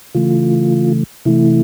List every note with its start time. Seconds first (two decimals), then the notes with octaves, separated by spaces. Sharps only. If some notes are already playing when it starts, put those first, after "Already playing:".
0.15 C#3 E3 A3 F4
1.25 C3 E3 A3 E4